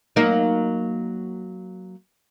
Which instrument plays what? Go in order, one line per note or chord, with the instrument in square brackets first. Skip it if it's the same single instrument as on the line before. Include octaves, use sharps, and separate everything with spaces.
[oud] F#3 A#3 D#4